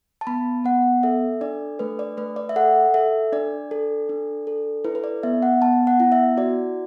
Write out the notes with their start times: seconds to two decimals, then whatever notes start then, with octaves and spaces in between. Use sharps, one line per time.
0.21 A5
0.27 B3 B5
0.64 B3 F#5
1.03 A4 E5
1.41 D4 D5
1.79 A3 B4
1.99 D5
2.17 A3 B4
2.36 D5
2.49 E5
2.56 A4 F#5
2.94 A4 E5
3.32 D4 D5
3.71 A4
4.09 D4
4.47 A4
4.85 E4 B4
4.95 B4
5.04 D5
5.23 B3 E5
5.42 F#5
5.61 B3 A5
5.87 F#5
6.00 E4
6.12 E5
6.37 F#4 D5